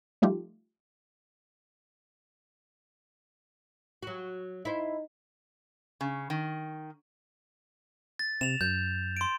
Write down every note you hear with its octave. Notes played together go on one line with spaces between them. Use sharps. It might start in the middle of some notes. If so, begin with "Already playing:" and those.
F3 G3 A3 D#4 F4 G4
F#3 F#4
D#4 E4 C5
C#3
D#3
A6
C3 E7 F7
F#2 G6
C6 D7